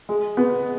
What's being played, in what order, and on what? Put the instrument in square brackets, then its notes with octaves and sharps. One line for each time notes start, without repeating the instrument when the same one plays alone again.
[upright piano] G#3
B3